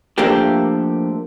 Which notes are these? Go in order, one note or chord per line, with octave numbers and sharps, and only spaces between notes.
F3 A3 A#3 D4 G4